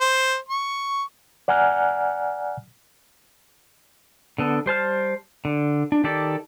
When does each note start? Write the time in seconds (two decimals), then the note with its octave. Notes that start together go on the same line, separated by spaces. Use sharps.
0.01 C5
0.49 C#6
1.48 D5 F#5 G#5 A#5 F6 F#6
4.38 D3 B3 A4
4.66 G3 C5 A5 F6
5.45 D3
5.92 D4
6.04 D#3 G4 A4 D5